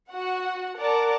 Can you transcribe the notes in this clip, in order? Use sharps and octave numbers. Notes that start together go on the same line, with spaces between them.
F#4 F#5
A#4 D5 F#5 A5 A#5 D6